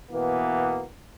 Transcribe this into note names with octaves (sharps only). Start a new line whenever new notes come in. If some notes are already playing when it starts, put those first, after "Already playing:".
B2 E3 A#3 B3